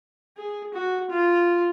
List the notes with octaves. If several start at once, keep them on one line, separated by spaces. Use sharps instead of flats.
G#4
F#4
F4